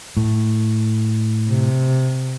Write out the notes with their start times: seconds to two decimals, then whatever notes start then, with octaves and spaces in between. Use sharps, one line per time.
0.17 A2
1.48 C3